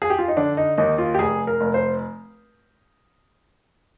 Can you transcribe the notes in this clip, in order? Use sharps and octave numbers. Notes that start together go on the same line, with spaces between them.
G#4
G4
F4
D#4
D3 D4
D#4
D#2 D#4
F4
G4
F1 G#4
A#4
F1
C5